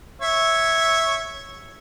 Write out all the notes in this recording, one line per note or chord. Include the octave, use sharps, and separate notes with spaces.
C#5 E5